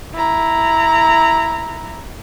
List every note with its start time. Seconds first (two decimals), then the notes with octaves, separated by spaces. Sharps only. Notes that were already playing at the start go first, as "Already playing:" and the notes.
0.14 E4 A#5